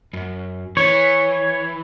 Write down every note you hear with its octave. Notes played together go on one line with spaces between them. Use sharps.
F#2
E3 C#5